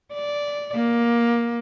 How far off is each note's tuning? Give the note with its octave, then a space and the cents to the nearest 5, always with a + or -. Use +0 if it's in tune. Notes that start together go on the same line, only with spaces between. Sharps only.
D5 -10
A#3 +15